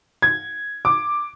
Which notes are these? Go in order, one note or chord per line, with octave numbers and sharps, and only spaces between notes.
G#6
D6